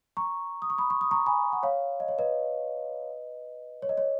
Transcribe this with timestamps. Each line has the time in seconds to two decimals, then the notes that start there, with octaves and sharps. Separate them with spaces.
0.17 A#5 C#6
0.62 D#6
0.70 C#6
0.78 B5 D#6
0.90 C#6
1.01 D#6
1.11 A#5 C#6
1.26 G#5 B5
1.53 F#5
1.63 C#5 F5
2.00 D#5
2.08 C#5
2.19 B4 D#5
3.82 C#5
3.89 D#5
3.98 C#5